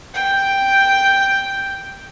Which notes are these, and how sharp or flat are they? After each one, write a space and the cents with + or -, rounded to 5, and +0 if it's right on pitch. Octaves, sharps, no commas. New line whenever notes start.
G5 +0